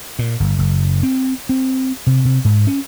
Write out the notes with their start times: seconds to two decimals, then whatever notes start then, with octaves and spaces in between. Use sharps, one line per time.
0.19 A#2
0.40 G1
0.59 F#1
1.03 C4
1.49 C4
2.07 C3
2.25 C3
2.45 G#2
2.67 C#4